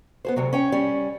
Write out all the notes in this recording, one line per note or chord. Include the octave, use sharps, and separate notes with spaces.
B3 G#4 C5
D2 C3 F#3
C#4 C#5 G5
G3 C#4